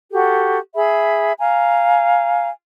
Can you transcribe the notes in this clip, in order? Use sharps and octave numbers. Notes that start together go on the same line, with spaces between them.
F#4 G4 A4
G#4 E5 B5
F5 G#5 A#5